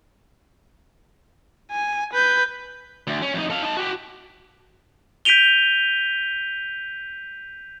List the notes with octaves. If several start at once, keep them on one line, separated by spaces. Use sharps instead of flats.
G#5
B4 G6
D2
C#4
F2 D#4
A4 F5
D#4 A5
F#4 G4
G6 B6 D7 D#7 F7 G7